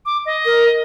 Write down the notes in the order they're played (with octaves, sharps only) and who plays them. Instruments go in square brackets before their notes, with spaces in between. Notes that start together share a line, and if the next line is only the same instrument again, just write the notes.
[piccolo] D6
D#5
[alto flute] A#4